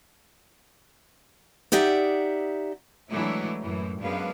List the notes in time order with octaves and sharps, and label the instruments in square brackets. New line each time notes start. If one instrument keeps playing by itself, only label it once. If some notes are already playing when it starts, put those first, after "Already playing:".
[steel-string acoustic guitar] D#4 G4 D5 E5 F#5
[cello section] E3 F#3 G#3 A3 D4 E4
F#2 A2 E3
F#2 G#3 B3 D4 B4 F5